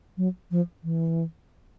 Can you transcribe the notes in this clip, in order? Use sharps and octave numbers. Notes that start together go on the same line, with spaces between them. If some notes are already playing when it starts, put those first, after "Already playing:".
F#3
F3
E3